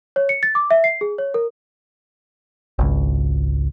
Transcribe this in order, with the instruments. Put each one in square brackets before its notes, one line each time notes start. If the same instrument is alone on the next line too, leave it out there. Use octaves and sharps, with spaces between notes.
[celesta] C#5
C#7
A6
D6
E5
C7
G#4
C#5
A#4
[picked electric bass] G#1 C#2